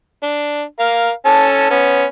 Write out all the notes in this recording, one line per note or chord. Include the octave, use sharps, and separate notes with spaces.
D4
A#4 F5
C#4 A4 A5
B3 C#4